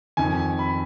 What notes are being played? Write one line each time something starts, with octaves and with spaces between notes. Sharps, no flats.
F2 D#3 G#5
B5